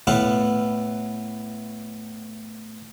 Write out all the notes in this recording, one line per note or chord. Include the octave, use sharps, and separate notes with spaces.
A2 B3 A4 B4 F5 B5